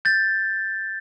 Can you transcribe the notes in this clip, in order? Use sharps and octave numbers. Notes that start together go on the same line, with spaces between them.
G6 A6